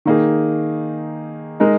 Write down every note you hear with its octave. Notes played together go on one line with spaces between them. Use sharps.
D#3 A#3 D#4 G#4
G#3 D#4 A#4